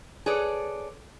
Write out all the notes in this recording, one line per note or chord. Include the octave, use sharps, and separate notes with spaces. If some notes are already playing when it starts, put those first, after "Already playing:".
G#4 A4 B4 C#5 D5